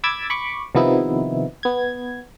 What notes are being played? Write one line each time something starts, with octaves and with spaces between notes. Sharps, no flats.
B5 D6 E6 G#6 A6
B5 C#6 D6
C3 D#3 F3 B3 D#4 E4
B3 G#6